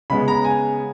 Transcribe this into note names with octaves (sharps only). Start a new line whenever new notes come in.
C#3 G#3 B3 B5
A#5
G#5